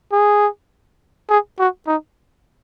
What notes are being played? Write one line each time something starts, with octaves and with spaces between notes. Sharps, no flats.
G#4
G#4
F#4
D#4